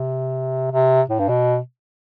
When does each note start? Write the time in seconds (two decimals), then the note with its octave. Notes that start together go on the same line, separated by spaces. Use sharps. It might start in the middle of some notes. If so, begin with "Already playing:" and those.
Already playing: C3
0.72 C3
1.09 A2
1.19 G2
1.29 B2